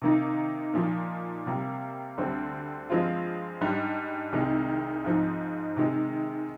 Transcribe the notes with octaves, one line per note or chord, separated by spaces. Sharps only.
C3 D#3 A#3 D#4
A#2 F3 A#3 D#4
C3 G3 A#3
D2 D3 G3 C4
G2 F3 G#3 C4 F4
G#2 G3 D4
C2 C3 D#3 G#3
G#2 F3 C4 D#4
C3 D#3 G#3